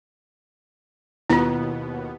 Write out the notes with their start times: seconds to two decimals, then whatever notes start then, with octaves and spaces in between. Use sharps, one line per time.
1.30 D#2 B2 B3 E4 F4